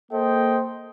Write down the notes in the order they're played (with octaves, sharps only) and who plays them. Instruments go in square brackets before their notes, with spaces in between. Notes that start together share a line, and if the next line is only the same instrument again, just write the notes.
[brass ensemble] A#3 A4 C5 D#5 G5